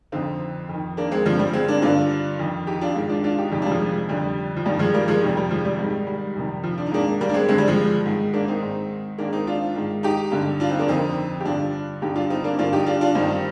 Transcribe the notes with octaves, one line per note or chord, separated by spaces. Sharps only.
F2 D3 C4 D#4
F2 D#3
A#3 D4
G#3 C4
G2 D3 F3
G3
G#3 C4
A#3 D4
G2 D3 D4 F4
F2 D#3
D#4 G4
D4 F4
G#2 D#3
D4 F4
D4 F4
D#4 G4
F2 C3 D#3 D#4 G4
D4 F4
G3
F3 G#3
F2 D3 G3
F3
G2 D#3 G3
F3 G#3
G3 A#3
F3 G#3
F2 C3 D#3 G3
G3
F3 G#3
G3
G#2 D#3
G3
F2 C3 D#3
F3
D4
D#4
G#2 D#3 A#3 D4
G3 A#3
D4
G#3 C4
G2 D3 G#3 C4
G3
F3 G#3
G#2 D#3
A#3 D4
C4 D#4
G#2 D#3
G#2 D#3 A#3 D4
C4 D#4
D4 F4
G#2 D#3
D#4 G4
G2 D3
D4 F4
C4 D#4
A#3 D4
F2 D3 C4 D#4
G4
G2 D3 D4 F4
G2 D3 D#4 G4
D4 F4
C4 D#4
A#3 D4
G2 D3 D4 F4
D#4 G4
D4 F4
D4 F4
G2 D#3 C4 D#4